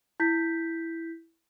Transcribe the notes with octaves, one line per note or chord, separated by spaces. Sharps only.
E4 G6 B6